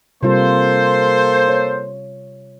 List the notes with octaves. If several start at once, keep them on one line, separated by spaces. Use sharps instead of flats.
C3 G3 A#3 F4 A4 C5
C#5